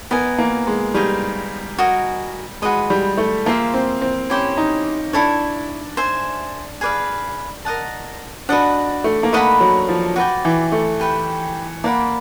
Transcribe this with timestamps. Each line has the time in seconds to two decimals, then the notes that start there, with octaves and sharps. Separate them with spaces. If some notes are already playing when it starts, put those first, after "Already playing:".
0.11 B3 A#4 D#5 G#5
0.39 A#3
0.67 G#3
0.94 G3 D#4 G#4 C#5 F5
1.78 F#4 A#4 D#5 G#5
2.62 G#3 F#4 B4 D#5
2.90 G3
3.17 A3
3.46 A#3 F4 G#4 C5 E5
3.74 C4
4.02 C4
4.30 C#4 E4 G4 C5
4.57 D#4
5.13 D4 E4 A4 C#5
5.97 C5 E5 G#5
6.81 G#4 B4 D5 F5
7.65 A#4 D#5 F#5 A5
8.49 D4 F#4 B4 D#5 F#5
9.04 A3
9.23 A#3
9.33 A3 B4 D#5 F#5 B5
9.61 F#3
9.89 F3
10.16 F#4 B4 D5 G5
10.45 E3
10.72 A3
11.00 G4 B4 E5 G5
11.84 A#3 D5 F#5 B5